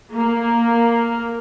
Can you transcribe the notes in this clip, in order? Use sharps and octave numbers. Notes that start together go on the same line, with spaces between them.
A#3